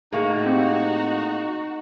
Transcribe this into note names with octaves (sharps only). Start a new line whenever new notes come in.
A2 A#3 D#4 F#4 G#4 F5 C#6
C4 G4